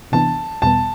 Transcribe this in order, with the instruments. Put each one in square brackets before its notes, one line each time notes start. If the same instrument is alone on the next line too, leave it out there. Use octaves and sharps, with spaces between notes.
[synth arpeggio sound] C3 E3 B3 D4 [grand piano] A5
[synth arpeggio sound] E2 B2 G3 B3 [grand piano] A5